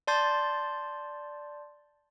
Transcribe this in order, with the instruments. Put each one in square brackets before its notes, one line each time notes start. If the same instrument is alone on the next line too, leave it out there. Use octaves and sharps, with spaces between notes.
[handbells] D5 A5 C6 G6 A6